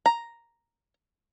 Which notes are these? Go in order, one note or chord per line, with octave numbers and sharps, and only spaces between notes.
A#5